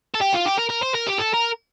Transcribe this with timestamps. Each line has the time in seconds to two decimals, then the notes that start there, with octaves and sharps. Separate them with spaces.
0.14 A4
0.21 G4
0.33 F4
0.45 G4
0.58 A#4
0.69 A#4
0.82 C5
0.94 A#4
1.06 G4
1.18 A4
1.33 A#4